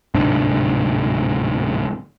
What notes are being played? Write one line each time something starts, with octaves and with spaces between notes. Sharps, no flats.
D1 G#2 C3 D4